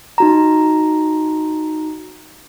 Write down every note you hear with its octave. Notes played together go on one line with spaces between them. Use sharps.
D#4 F#4 A#5